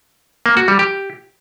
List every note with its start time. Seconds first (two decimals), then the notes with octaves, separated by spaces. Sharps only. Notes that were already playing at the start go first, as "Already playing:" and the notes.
0.46 A#3
0.57 F#4
0.68 G3
0.79 G4